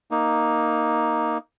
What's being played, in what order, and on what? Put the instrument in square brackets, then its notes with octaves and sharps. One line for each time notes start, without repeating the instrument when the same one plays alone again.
[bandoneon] A#3 D#4